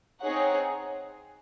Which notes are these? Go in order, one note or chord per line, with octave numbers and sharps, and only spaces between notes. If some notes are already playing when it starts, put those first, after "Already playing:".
C4 D#4 G#4 C#5 F#5